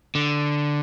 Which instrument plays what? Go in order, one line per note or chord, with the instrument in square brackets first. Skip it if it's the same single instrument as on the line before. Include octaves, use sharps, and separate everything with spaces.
[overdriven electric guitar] D3